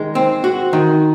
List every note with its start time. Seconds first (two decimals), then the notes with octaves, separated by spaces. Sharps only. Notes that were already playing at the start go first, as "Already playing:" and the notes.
Already playing: D#3 G#3
0.15 C4
0.44 F#4
0.73 D#3